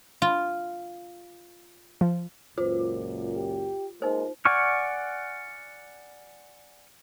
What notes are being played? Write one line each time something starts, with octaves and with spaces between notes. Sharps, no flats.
F4
F3
C#2 F#2 A#2 F4 C5
G4
G#3 A#3 D#4 C5
D5 F#5 G#5 C#6 F6